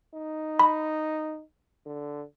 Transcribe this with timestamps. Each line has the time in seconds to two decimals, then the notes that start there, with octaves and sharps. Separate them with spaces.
0.14 D#4
0.59 B5
1.86 D3